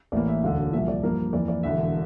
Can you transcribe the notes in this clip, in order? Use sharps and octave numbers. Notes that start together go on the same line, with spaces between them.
A1 A2 E3 A#3 D5
E5
E1 D2 D3 F5
C2 A#2 F3 E5
D5
G2 F3 A#3 A#4
F2 E3 A#3 D5
D5
E1 E2 D3 E5